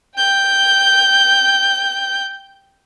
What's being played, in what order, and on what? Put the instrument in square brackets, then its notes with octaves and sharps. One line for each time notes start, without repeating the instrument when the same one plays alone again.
[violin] G5 G6